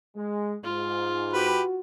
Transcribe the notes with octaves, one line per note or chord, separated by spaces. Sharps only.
G#3
G#2 F4
F#4 G4 B4